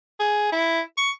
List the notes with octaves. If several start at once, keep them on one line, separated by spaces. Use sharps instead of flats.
G#4
E4
C#6